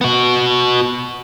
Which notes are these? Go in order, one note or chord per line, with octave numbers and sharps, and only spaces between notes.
B3 F#4